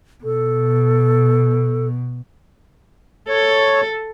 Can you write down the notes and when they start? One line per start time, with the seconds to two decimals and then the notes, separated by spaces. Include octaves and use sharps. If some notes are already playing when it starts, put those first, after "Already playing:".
0.24 B2 A4
3.28 A4 C#5